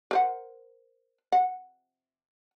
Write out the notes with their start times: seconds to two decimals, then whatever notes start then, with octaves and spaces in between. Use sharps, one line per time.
0.11 A#4 C5 F#5
1.32 F#5